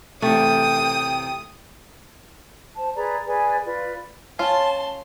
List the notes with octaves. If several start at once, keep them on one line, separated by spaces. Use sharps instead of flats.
A1 C3 A3 G5 D#6
C5 A5
G#4 B4 D5 A#5
G#4 B4 D5 G#5
F4 B4 D5
C#4 F4 A5 C6